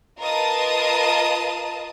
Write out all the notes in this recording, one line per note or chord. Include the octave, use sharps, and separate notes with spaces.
F4 A#4 B4 D#5 A5 D#6